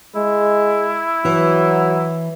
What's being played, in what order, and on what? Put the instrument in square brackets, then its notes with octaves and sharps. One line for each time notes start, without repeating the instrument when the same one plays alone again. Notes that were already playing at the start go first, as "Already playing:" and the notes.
[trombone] G#3 [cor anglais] E4
[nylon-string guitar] E3 [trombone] F#3